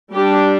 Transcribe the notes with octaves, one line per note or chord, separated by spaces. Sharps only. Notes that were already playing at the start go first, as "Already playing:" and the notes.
G3 D4 G4